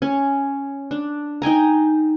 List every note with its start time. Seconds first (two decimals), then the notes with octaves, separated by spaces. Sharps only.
0.02 C#4
0.91 D4
1.42 D#4 G5 G#5 A#5